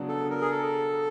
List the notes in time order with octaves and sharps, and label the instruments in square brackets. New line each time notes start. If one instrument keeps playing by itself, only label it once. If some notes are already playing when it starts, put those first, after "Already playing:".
Already playing: [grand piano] C#3 F#3 B3 D4
[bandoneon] A4
A#4
G#4
A4